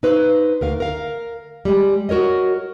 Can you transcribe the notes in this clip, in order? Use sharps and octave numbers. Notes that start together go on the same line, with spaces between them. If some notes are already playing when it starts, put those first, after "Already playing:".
D#4 B4 C5
D2 A#4 F5
A#4 F5
G3 G#3
F#4 A#4 C#5 D#5